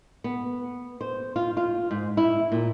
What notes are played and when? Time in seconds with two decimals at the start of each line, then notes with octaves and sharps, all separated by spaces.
0.24 B3
1.01 C5
1.36 F4
1.57 F4
1.91 G#2
2.17 E4
2.52 A#2